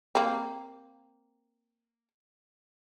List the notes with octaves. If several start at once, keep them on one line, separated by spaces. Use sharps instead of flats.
A#3 C4